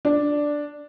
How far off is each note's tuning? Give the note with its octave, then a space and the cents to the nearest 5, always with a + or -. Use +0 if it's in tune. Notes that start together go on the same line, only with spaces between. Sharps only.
D4 +0 D5 +0